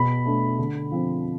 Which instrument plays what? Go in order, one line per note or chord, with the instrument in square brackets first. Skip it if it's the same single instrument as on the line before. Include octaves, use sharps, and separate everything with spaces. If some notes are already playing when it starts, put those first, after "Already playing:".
Already playing: [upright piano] B2 B5
A3 D4
D3
F3 C4